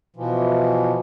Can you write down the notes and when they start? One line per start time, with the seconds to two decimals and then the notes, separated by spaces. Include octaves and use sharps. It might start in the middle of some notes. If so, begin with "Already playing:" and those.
0.16 B2 E3 F3